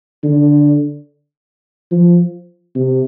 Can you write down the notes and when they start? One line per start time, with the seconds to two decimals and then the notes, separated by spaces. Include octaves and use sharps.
0.23 D3
1.91 F3
2.75 C3